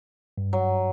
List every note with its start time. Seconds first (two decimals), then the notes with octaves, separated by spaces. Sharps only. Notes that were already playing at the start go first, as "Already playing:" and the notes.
0.38 G2
0.53 F#3